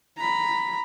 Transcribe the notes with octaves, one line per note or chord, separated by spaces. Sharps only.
A#5 B5